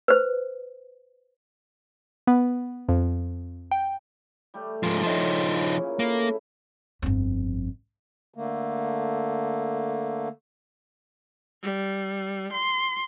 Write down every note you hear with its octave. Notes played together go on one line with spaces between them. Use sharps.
B4 C5
B3
F2
G5
G3 A3 G4
G#2 E3 F3
C#3 F3 D#4 D5
C#4 G#4
A#2 C#4 E4
A3 A#3 E4 A4
G1 F2
D3 A3 A#3
G3
C6